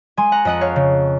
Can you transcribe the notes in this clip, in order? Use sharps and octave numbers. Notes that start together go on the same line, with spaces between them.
G#3 G#5 C6
F#5 A#5
F2 D#5 F#5
C#5 F5
C#3